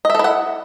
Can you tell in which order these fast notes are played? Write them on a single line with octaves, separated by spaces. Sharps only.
D#5 E5 A4 E4 F#5